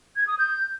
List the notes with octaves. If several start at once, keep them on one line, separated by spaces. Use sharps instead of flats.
G#6
D#6
G6